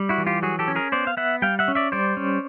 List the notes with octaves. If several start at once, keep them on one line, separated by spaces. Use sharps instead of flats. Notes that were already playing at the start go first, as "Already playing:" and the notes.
Already playing: G3
E4 F#4
E3
F4 G4
F#3 F#4 G#4
G4 A4
C#4
G#4 A#4
B3 C5 D5
F5
B3 E5 F#5
G3 F5 G5
E5 F#5
C#4
D5 E5
G3 C5 D5
C#4